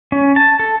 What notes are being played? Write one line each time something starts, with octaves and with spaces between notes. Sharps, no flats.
C#4
A5
A4